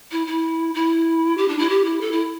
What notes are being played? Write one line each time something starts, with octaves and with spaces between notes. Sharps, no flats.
E4
E4
E4
G4
D4
E4
G4
E4
A4
E4